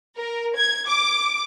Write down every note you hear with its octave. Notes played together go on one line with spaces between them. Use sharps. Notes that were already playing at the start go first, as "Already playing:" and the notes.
A#4
G#6
D6